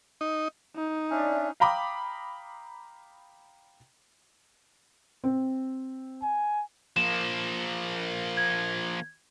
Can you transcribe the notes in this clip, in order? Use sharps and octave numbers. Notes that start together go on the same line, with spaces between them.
D#4
D#4
C#4 D4 D5 E5
F5 G5 A#5 B5 D6 D#6
C4
G#5
F3 A#3 E7
G#6